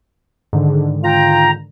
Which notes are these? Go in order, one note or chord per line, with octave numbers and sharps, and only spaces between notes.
G#2 D3 D#3
F4 G5 A#5